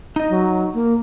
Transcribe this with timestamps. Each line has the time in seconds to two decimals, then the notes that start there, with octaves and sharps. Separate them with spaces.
0.16 D#4 D#5
0.29 F#3
0.74 A#3